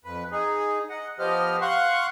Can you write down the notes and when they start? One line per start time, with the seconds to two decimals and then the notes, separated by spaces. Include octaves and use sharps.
0.05 F2 B4
0.32 D#4 G#4
0.89 D#5 F#5
1.19 F3 B3 G4 C5 D#5 F6
1.61 F5 F#5 C6 C#6 F#6